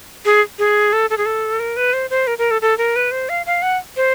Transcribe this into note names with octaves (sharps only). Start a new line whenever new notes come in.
G#4
G#4
A4
A4
G#4
A4
A#4
B4
C5
C5
A#4
A#4
A4
A4
A#4
B4
C5
F5
F5
F#5
C5